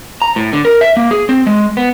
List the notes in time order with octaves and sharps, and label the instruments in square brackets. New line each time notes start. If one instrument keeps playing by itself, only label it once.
[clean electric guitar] A#5
A2
D3
A#4
E5
A#3
G#4
C4
G#3
B3